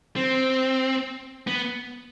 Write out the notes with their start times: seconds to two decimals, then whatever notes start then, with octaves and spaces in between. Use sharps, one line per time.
0.16 C4
1.47 B3